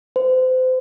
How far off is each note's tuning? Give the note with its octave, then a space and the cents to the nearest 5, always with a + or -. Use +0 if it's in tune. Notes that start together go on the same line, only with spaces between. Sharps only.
C5 -30